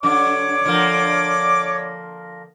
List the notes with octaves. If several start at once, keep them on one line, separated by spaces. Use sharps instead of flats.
F#2 D3 C#5 D5 D6
D3 F3 A#3